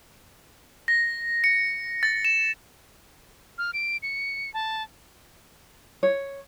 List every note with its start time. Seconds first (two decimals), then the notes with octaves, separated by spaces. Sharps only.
0.88 A#6
1.44 C#7
2.03 A6
2.25 E7
3.58 F6
3.73 D7
4.02 C#7
4.54 A5
6.03 C#5